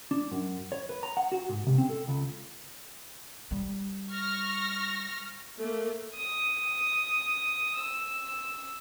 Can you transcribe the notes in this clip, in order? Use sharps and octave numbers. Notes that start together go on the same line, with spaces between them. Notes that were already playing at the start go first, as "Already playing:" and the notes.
D4
F#2
C#5
B4
A#5
F#5
F#4
G#2
C3
C4
A4
C#2
G3
C#6 F6 A#6
A3 A#3
D#6
E6